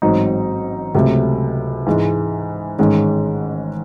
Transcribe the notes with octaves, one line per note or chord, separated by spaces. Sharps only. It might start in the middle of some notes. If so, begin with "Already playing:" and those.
A1 G#2 F#3 C4 D#4
C#2 C3 F#3 A3
G#2 E3 G#3
A1 G#2 D#3 G#3 C#4